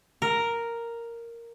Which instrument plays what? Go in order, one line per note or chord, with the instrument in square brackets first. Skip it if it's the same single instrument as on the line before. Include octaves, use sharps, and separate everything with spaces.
[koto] A#4